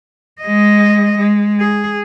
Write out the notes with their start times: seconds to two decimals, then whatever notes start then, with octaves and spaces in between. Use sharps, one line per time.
0.42 G#3 D#5
1.18 G#3
1.60 G#4